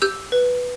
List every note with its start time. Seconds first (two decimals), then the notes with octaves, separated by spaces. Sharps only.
0.02 G4 E6 G6
0.32 B4